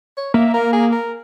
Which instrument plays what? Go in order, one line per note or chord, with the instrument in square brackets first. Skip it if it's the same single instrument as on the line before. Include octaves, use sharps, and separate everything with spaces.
[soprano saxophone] C#5
[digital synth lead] A#3 [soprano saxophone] E5
[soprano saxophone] A#4
G#4
A#4